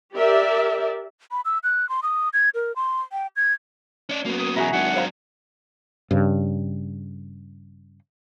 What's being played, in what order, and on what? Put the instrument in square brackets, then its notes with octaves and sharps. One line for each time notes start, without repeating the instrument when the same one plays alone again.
[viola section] G4 A#4 D5 E5
[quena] B5
E6
F#6
C6
D#6
G#6
A#4
C6
G5
G#6
[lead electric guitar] C#4 D5
[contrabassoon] F#2 [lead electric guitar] A#3 B3
[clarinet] D#6
[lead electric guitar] E2 B2 [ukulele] E4 F#4 G#4 [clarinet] A#5
[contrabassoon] G#1 [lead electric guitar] F#3 D4 [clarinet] F#5
[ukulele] C5 F5 A#5
[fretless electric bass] G2 C#3